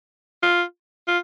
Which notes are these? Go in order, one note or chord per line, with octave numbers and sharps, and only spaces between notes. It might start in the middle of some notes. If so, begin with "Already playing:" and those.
F4
F4